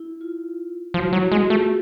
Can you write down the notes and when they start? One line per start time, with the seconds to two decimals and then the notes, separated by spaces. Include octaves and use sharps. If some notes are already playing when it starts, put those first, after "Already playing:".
Already playing: E4
0.21 F4
0.94 F3 E4 F#4
1.12 F#3 F#4
1.21 G4
1.31 G#3 F#4 G#4
1.50 A3 F4 G4